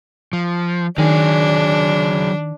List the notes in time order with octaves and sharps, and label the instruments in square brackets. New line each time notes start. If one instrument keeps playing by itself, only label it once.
[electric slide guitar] F3
[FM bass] D#3 [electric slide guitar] F#3 G#4 [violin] D4